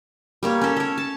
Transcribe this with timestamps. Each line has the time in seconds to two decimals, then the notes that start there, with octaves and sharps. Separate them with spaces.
0.43 G3 A#3 C#5
0.61 C#4 A4
0.77 A4 C#5
0.98 A5